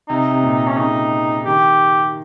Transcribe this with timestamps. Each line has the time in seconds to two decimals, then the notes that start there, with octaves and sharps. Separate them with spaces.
0.09 C3 D#4
0.31 C3
0.43 A#2
0.68 C#4
0.77 C#3 D#4
1.45 D#3 G4